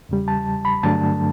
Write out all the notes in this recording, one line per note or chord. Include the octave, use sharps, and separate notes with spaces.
E2 C#3 G3
A5
B5
G2 D3 F#3 A3 D4 A5